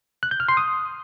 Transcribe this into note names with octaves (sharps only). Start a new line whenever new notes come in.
F#6
G6
F6
C6
D#6